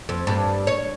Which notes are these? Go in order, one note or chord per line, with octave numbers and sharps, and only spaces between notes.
F2
G2
C#5